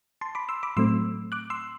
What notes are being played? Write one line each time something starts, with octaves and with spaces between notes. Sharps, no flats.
A5 C6
B5 D6
C6 E6
B5 D6
A2 F#3 A3 C4 C6 E6
D6 F#6
C6 E6